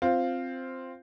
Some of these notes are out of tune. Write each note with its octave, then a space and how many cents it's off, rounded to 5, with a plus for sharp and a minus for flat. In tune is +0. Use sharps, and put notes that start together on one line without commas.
C4 +0 F4 +0